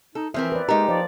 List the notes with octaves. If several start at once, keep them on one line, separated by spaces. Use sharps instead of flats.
D#4 A4
E3 F3 C4 A#4 E5
B4 D5
G#3 D#4 G4 A#4 A#5
F3 D5